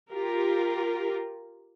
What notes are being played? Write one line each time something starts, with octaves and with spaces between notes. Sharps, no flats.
F4 G4 A#4